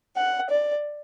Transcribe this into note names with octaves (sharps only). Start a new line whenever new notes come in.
F#5
D5